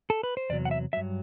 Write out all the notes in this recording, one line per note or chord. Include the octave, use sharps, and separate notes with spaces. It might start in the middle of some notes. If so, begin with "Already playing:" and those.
A4
B4
C5
E2 C3 F#3 D5
F#5
E5
G2 F#3 E5